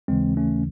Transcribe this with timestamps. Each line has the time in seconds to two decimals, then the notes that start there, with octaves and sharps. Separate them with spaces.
0.08 D#2 C#3 E3 G#3 C4
0.37 A3 C#4